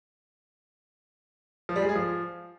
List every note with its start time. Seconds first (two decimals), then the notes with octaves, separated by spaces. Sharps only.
1.69 F3
1.76 G3
1.82 G#3
1.89 G#4
1.95 F3